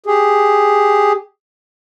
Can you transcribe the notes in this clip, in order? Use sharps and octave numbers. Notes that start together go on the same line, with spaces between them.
G4 G#4